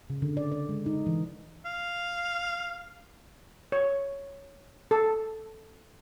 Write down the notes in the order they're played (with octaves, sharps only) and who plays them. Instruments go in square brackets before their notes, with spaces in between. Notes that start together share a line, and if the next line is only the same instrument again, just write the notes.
[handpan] C#3
D3
D5
D5
G#3
D#4
E3
[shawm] F5
[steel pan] C#5
A4